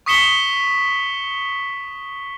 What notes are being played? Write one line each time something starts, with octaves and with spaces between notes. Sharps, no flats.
C#6 D#6 B6 C#7 E7 G7